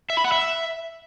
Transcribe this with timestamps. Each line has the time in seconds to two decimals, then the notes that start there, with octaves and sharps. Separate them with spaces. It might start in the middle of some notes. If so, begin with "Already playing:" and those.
0.10 E5
0.17 B5
0.24 F#5
0.32 E5